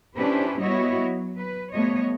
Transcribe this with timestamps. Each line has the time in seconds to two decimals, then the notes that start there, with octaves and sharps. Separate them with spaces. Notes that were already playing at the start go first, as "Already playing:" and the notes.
0.16 C#4 D4 E4 G4 B4 C5
0.61 G3 B3 E4 F#4 C#5 D#5
1.05 F#3
1.38 B4
1.73 F3 G3 A3 B3 C#5 D#5